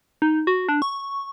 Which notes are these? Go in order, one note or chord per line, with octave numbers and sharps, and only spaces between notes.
D#4
F#4
D4
C#6